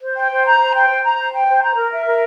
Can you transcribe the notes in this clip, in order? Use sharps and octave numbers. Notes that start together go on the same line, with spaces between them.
C5
G5
C5
A#5
C5
G5
C5
A#5
C5
G5
C5
A#5
A#4
E5
A#4